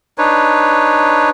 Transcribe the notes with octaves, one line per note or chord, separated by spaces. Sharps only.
D4 D#4 B4 C#5